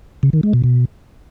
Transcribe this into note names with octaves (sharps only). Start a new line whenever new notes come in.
C#3
D#3
G#3
B2
B2